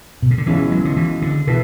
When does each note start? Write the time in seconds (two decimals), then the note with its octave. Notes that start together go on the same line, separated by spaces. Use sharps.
0.22 B2
0.31 C#3
0.38 D3
0.46 C#2 B2 E3 G#3 C#4 E4
0.72 F#3
0.85 D3
0.97 E3
1.22 D3
1.47 B2 E3 B3 E4 A4